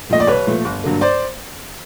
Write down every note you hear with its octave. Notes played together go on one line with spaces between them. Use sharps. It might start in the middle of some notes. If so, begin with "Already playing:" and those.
A#2 F3 A3 D#5
D5
C2 B4 C#5
A#2 F3 A3
G1
G2 D3 F#3 A#3
C5 D5